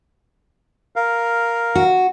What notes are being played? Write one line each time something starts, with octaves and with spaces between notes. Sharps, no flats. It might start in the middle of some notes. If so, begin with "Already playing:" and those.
A#4 F5
F#4